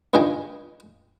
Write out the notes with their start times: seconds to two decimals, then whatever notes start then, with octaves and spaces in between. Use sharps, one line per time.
0.14 C#2 G2 D#3 G#4 D#5 G5